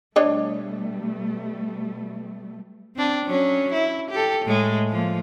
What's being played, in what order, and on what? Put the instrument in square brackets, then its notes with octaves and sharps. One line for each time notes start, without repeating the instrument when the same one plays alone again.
[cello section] B2 G3 A3 [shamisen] D4 C#5 D#5
[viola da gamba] C4 D4
F#3 C#4
E4
G4 A4
A2 G#3
F3 A#3